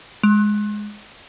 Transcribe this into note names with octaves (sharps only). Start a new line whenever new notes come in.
G#3